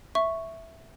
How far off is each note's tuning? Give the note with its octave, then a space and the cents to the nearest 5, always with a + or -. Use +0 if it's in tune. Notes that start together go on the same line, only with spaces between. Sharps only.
E5 +0 C#6 +0